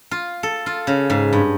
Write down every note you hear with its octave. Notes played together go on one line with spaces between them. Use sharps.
F4
A4
F4
C#3
G#2
G2